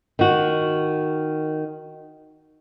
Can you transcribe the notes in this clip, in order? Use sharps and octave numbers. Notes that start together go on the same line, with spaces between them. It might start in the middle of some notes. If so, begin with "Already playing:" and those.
D#3 F#4